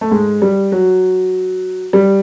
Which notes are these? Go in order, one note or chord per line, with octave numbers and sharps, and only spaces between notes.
A3
G#2 G#3
G3
F#3
G3